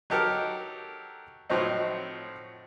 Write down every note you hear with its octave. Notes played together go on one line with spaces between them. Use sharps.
F#3 D#4 G4 A4 A#4
A2 F3 F#3 C4 D#4